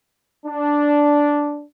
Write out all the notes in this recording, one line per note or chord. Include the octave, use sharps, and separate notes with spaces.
D4